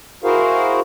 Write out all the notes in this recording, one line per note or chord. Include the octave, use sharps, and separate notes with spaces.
E4 F#4 G#4 A#4 C5 F5